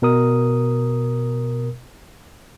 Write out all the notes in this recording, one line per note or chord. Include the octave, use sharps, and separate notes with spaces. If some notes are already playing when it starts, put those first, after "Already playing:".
B2 A#4 D#6